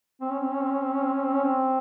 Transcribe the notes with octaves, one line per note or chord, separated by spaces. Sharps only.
C4
C#4
C4
C#4
C4
C#4
C4
C#4
C4
C#4
C4
C#4
C4